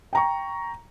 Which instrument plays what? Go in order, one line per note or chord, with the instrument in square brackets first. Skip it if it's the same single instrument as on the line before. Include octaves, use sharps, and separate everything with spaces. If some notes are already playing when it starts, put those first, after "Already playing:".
[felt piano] G5 A#5 C#6